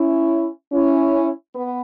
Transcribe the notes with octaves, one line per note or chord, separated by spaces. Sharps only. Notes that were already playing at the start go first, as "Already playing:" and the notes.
Already playing: C#4 E4
C#4 E4
B3